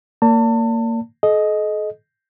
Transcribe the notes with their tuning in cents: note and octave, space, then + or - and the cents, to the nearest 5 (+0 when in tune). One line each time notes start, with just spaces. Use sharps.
A#3 -20 D5 -35 A5 +35
A4 -45 D#5 +0